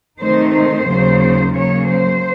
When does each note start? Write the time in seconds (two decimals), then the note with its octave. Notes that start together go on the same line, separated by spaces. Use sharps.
0.19 C3 D#3 A3 D#4 C5
0.53 C5
0.87 D#2 C#3 F#3 A#3
1.54 C#3 F#3 A#3 C#5
1.87 C5